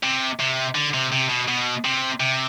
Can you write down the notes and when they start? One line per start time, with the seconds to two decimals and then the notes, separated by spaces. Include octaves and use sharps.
0.03 C3
0.40 C3
0.75 D3
0.94 C3
1.12 C3
1.30 B2
1.48 B2
1.85 C3
2.20 C3